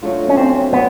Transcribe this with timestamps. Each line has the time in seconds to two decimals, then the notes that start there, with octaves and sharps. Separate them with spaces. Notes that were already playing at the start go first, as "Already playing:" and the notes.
0.03 F#3 A3 D4 F4
0.29 C#4
0.37 C4
0.73 F#3 B3